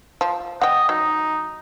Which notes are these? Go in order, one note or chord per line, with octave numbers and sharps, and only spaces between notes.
F3
D#5 F#5 G5
F#3 D#4